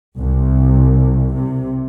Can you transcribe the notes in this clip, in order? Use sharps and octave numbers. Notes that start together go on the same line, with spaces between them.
C2
C3